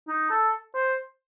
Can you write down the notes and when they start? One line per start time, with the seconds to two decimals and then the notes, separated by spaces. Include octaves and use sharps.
0.08 D#4
0.30 A4
0.74 C5